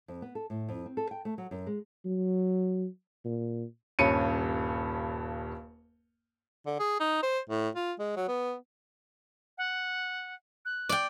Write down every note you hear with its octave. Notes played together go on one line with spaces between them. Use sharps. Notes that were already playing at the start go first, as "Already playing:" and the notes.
F2
B3
A4
A2
F2
C4
A4
G5
A3
F#3
F#2
G#3
F#3
A#2
D#1 G2 C#4 C#7 D#7
D3
G#4
D#4
C5
A2
F4
G#3
F#3
B3
F#5
F#6
D5 G5